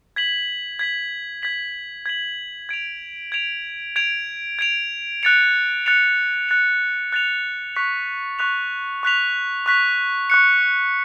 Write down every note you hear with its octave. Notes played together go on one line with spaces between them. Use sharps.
G#6 B6 F#7
G#6 B6 F#7
G#6 B6 F#7
G#6 B6 F#7
G#6 D7 F7
G#6 D7 F7
G#6 D7 F7
G#6 D7 F7
F#6 A6 C#7 F7
F#6 A6 C#7 F7
F#6 A6 C#7 F7
F#6 A6 C#7 F7
C#6 F#6 B6 F7
C#6 F#6 B6 F7
C#6 F#6 B6 F7
C#6 F#6 B6 F7
C#6 F#6 C#7